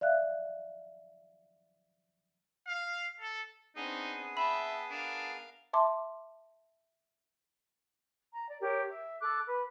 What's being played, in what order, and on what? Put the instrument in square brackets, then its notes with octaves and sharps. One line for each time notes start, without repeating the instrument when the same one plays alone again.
[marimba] D5 E5 F5 F#6
[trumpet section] F5
A4
[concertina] B3 G#4 D#6 [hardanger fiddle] C4 D4 [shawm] D#4
[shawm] E5 [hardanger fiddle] G5 A5 [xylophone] B5
[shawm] D4 [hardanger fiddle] A#4 F5
[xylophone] E5 A5 C6 D6
[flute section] A#5
D5
G4 A#4 C#5
E5
A4 D6 F#6
B4